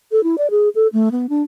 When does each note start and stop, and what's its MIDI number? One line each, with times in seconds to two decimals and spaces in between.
0.12 0.23 69
0.23 0.36 64
0.38 0.47 74
0.51 0.69 68
0.75 0.87 69
0.93 1.09 57
1.12 1.26 59
1.29 1.43 62